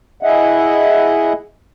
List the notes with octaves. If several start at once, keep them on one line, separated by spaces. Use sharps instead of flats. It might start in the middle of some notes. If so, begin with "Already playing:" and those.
E4 G#4 D#5 E5 F#5